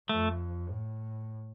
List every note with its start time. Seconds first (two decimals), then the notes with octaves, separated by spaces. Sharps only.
0.09 F2 A3
0.70 A2